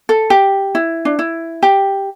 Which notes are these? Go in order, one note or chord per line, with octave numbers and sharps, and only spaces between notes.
A4
G4
E4
D4
E4
G4